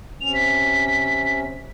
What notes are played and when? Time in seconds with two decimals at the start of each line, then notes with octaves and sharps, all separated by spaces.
0.21 C3 C#4 F7
0.34 B6